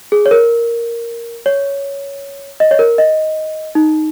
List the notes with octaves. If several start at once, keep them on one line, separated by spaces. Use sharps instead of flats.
G#4
C#5
A#4
C#5
D#5
C#5
A#4
D#5
D#4